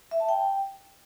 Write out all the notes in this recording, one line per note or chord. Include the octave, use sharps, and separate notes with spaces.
E5
A5
G5